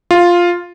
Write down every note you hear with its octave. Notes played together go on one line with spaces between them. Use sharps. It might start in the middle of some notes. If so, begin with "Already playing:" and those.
F4